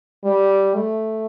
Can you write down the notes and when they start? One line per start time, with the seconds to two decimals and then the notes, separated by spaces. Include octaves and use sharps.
0.25 G3
0.75 A3